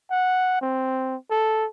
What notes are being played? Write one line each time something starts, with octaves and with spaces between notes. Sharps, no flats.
F#5
C4
A4